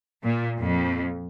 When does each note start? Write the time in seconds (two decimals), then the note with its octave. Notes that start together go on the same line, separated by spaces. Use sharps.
0.24 A#2
0.59 F2